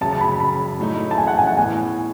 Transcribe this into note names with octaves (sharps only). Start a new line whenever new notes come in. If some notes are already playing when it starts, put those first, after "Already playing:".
F#2 C#3 F#3 A5
A5
B5
B5
A2 F#3 A3 D#4
A5
G#5
F#5
G#5
F#5
A2 E3 B3 G#5